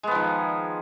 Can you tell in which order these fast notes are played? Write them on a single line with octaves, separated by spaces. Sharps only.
G#3 B3 F3 D#3